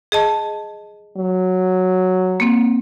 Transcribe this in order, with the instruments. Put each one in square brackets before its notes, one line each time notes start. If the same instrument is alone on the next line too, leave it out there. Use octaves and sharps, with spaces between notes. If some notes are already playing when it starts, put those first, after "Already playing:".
[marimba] G#4 D#5 A5
[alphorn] F#3
[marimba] A#3 C4